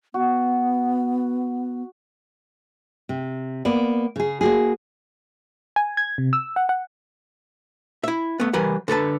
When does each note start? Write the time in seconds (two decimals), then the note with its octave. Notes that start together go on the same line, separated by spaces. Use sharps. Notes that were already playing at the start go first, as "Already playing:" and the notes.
0.14 B3 F#4
3.09 C3
3.65 A#3 B3 D5
4.16 C#3 G#4
4.41 A#3 F#4 G#4
5.76 G#5
5.97 G#6
6.18 C3
6.33 E6
6.56 F#5
6.69 F#5
8.03 E4 E5
8.40 A3 B3
8.53 E3 G3 A#4 B4 F#5
8.88 D3 A4 B4 A5